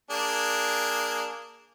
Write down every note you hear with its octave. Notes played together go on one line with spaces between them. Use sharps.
A#3 D4 G#4